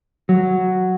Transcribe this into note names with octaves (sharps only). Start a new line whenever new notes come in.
F#3